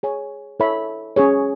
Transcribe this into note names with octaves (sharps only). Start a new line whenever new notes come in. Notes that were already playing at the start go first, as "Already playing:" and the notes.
G#4 C#5 G#5
E4 A4 C#5 E5 B5
C#4 G#4 C#5